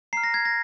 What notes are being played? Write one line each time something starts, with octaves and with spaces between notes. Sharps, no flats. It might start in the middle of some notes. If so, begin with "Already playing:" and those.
A#5 F6 C7
A#6
G#6
A#6